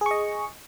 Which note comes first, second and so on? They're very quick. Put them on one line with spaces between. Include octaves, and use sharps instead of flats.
G#4 C#6 D#5